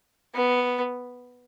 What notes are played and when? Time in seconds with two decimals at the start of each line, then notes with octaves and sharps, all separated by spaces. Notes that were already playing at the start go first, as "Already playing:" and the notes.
0.35 B3